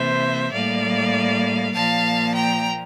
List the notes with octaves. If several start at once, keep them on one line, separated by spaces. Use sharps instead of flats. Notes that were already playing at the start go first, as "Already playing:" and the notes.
Already playing: C3 E3 A#3 C5 E5
A2 G3 A#3 D5 F5
A#2 F3 A#3 F5 A5
G5 A#5